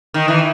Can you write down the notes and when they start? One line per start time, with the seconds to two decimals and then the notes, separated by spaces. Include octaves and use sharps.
0.14 D#3
0.28 E3